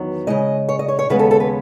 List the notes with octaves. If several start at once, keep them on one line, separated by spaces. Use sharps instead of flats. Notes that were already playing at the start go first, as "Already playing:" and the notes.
Already playing: E2 D#3 F#3 B3
C#3 E3 G#3 D#5
C#5
D#5
C#5
C#5
D#2 C#3 G#3 B3 B4
A4
A4
B4